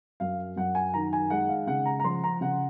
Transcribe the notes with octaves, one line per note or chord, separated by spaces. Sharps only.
F#2 F5
F#2 F#5
G#5
D#3 A#5
G#5
G#3 F#5
F5
C#3 F#5
A#5
A#5
F3 C6
A#5
C#3 F#5